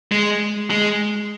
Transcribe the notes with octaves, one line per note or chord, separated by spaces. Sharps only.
G#3
G#3